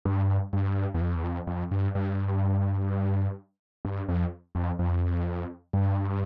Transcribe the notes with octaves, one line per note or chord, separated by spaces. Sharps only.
G2
G2
E2
F2
E2
F2
F2
G2
G2
G2
F2
F2
F2
G2